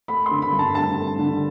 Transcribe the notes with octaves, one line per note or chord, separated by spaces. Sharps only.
A3 B5
C6
D3
B5
G2
A5
G2 A5
A3
D3